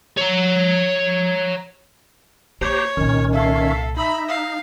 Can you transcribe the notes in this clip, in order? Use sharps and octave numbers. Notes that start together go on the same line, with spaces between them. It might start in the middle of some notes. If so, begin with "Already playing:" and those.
C#5 A#5
A#3 E4 G4 C5 C#5 A#5
C2 A#2 D#3 C#4
A4 E5 F5
D#4 E5 A#5 B5
F5